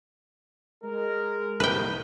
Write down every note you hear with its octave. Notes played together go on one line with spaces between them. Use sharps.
G#3 A#4
C2 D#3 B4 G5